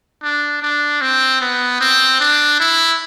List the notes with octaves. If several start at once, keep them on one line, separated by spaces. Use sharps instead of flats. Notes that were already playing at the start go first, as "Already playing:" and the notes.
D4
D4
C4
B3
C4
D4
E4